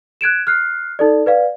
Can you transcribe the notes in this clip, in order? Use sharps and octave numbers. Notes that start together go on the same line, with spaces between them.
F#6 G#6 D7 E7
F6 F#6 C7
D#4 A4 D5
B4 D5 F5